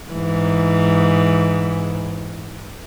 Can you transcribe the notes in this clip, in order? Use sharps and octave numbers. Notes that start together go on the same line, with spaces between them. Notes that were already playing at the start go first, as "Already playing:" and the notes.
G#2 E3